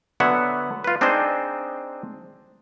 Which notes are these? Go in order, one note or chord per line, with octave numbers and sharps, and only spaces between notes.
D3 F#3 B3 C#5 E5 F#5
F4 B4
C4 D4 D#4 G#4 C5 D#5